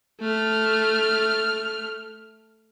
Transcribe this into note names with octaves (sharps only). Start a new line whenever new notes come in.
A3 F6